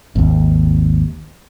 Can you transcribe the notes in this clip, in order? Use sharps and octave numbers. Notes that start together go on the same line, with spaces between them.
G#1 D#2